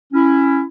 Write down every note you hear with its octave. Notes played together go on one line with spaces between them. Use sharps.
C#4 E4